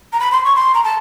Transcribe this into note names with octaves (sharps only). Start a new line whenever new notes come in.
A#5
B5
C6
C#6
C6
A#5
A5